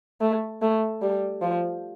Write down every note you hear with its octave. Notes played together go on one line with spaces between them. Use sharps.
A3
A3
G3
F3